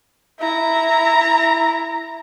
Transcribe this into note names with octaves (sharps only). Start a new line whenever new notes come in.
E4 A#5